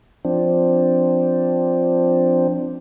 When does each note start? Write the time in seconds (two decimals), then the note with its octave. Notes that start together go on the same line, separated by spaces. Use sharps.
0.25 F3 C4 D4